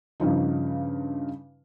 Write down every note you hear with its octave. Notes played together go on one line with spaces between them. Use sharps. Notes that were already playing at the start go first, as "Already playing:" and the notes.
G2 C#3 F3 D#4